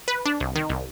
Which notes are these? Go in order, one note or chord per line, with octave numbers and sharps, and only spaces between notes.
B4
D4
C2
D#3
C2